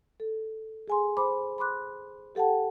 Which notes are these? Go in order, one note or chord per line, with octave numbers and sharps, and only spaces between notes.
A4
G#4 G#5 C6
C5 B5 D6
B5 C6 D6 F#6
G4 A4 F#5 G5 A5